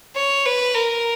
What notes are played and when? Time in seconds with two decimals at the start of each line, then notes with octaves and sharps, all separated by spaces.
0.16 C#5
0.46 B4
0.75 A#4